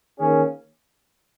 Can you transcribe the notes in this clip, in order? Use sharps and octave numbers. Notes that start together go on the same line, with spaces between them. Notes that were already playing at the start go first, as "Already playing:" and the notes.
D#3 A#3 C#4 G#4